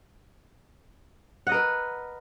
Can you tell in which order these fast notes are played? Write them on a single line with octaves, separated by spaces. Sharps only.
F#5 D#5 A#4 B4